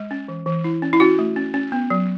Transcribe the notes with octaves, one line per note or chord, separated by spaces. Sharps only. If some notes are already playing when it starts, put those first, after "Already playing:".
Already playing: G#3
C#4
E3
E3
E4
C#4
E4
C#4 F#4
A3
C#4
C#4
B3
F#3